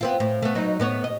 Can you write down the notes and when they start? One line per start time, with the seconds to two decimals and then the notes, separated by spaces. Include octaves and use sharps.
0.01 B3 C4 F4
0.20 A2
0.43 A3 B3
0.55 F#3 D#4 B4
0.80 A2 B3 C#5
1.04 D#5